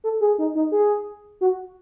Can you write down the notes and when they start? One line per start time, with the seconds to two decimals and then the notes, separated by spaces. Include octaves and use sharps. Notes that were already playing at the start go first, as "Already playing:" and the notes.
0.04 A4
0.21 G#4
0.39 D#4
0.55 D#4
0.72 G#4
1.41 F#4